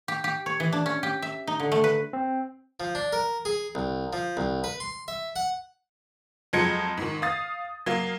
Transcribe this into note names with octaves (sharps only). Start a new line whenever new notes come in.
G4
G4
C#5
E3
D4
C#4
G4
E5
D#4
D3
A3
B4
C4
F3
D4
A#4
G#4
C2
F3
C2
B4
C6
E5
F#5
F2 F3 F#3 G#3 G#6 C#7
G#2 D#3
F5 D#6 A6
F#3 A#3 F5